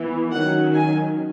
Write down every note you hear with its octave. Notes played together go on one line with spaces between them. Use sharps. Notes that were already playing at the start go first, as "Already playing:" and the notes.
Already playing: E3 B3
D#3 F#3 C#4 F#5
G#5